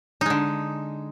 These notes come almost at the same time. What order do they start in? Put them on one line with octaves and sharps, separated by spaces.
D#4 G#3 D3